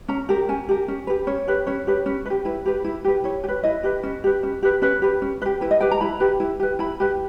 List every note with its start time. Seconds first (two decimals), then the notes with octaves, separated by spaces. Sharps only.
0.08 C#4 A#5
0.29 G4 A#4
0.49 C#4 G#5
0.69 G4 A#4
0.88 C#4
1.07 G4 B4
1.27 C#4 C#5
1.48 G4 B4
1.67 C#4 C#5
1.87 G4 B4
2.06 C#4
2.26 B4
2.30 G4
2.45 E4 B4
2.66 G4 B4
2.84 E4
3.05 G4 B4
3.24 E4 C#5
3.44 G4
3.48 B4
3.63 E4 D#5
3.83 G4 B4
4.03 C#4
4.24 G4 B4
4.43 C#4
4.63 G4 B4
4.82 C#4 B4
5.02 G4 B4
5.22 C#4
5.42 B4
5.46 G4
5.61 E4 B4
5.71 D#5
5.80 G4 B4 G5
5.91 A#5
6.01 E4 B5
6.20 G4 B4
6.40 E4
6.60 G4 B4
6.79 E4 B5
7.00 G4 B4